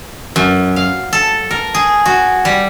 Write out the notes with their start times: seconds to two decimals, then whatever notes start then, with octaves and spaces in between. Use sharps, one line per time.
0.36 F#2
0.76 F5
1.13 A4
1.51 A#4
1.74 G#4
2.05 F#4
2.45 G3